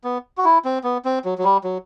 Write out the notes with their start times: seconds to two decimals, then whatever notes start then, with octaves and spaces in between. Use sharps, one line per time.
0.04 B3
0.38 F#4
0.45 E4
0.65 C4
0.84 B3
1.05 C4
1.25 F#3
1.38 F#3
1.44 G3
1.64 F#3